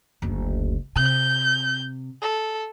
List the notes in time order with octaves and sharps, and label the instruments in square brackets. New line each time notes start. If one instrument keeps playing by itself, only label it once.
[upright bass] F#1 D2
[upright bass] C3 [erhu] G6
[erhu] A4